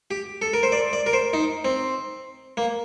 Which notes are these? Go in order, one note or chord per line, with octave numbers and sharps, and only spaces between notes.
G4
A4
A#4
C5
D5
D5
A#4
C5
D#4
C4
A#3